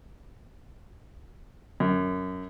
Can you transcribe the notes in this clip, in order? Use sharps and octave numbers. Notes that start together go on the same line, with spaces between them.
F#2